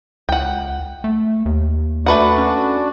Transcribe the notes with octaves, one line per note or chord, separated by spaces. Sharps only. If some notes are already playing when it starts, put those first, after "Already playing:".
C#2 F#5 G5
A3
D#2
A3 D4 F#4 B4 D5 F#5
C#4